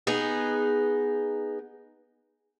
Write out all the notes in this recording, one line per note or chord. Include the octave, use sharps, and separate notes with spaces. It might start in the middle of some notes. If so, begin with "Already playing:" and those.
B3 D#4 G#4